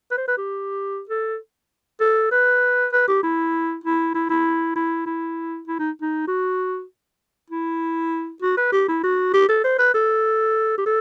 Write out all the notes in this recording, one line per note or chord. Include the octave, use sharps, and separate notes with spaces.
B4
C5
B4
G4
A4
A4
B4
B4
G4
E4
E4
E4
E4
E4
E4
E4
D#4
D#4
F#4
E4
F#4
B4
G4
E4
F#4
G4
A4
C5
B4
A4
G4
A4